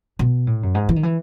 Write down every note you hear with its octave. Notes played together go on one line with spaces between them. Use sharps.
B2
A2
F#2
G#2
E3
D#3
E3